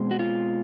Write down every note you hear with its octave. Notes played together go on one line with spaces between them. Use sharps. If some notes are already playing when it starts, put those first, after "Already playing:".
Already playing: B2 G#3 C4
F#4
F4